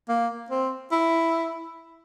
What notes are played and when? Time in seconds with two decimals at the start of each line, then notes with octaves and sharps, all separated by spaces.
0.09 A#3
0.50 C4
0.92 E4